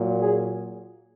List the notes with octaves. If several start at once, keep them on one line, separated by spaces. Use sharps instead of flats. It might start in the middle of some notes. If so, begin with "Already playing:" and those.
Already playing: A#2 F#3
G#4